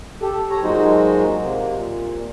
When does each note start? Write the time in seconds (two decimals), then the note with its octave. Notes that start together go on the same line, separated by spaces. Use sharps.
0.22 G4 A4
0.50 A4 C#5 A#5
0.63 A#2 F#3 G#3 D#4 F#4 C5
1.42 C3 A#3
1.75 A#2